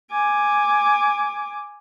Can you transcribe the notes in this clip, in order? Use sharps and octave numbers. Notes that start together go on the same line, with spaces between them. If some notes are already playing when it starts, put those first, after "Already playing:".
G#5 D6